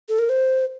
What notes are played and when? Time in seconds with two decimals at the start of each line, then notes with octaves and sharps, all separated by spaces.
0.09 A4
0.19 A#4
0.29 C5